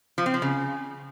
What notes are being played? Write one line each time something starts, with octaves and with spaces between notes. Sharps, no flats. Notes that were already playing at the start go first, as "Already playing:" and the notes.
F3
C4
F3
C#3